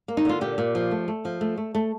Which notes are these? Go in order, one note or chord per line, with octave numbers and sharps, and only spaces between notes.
A#3
D#4
D3 F4
A#2 G4
A#2
F3
A3
A3
F3
A3
A3
A3